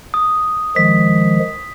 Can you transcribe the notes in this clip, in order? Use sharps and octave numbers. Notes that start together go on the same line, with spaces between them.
D#6
D#3 F3 G#3 B6